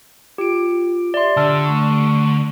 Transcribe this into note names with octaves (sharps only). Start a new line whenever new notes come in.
F4 G4 D7
G4 D5 E5 C6
D3 G4 A5 E6 F6
A3 C#6